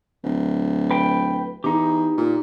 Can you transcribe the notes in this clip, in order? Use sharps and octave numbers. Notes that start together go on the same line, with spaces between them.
D1
B4 G5
E2 D#4 G4
A#2